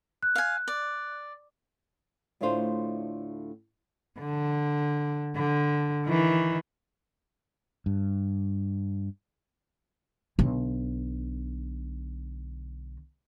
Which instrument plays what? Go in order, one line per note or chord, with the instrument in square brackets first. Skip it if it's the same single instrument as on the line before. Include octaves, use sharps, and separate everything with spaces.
[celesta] F#6
[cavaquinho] F5 G#5
D5
[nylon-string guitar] D2 A2 A3 D4 F4 C5
[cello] D3
D3
D#3 E3
[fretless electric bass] G2
[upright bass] B1 D3